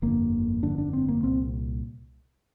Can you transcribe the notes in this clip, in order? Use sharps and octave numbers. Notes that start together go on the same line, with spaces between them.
G1 F2 D3 A#3
G1 F2 D3 D4
D4
C4
A#3
C2 A#2 C4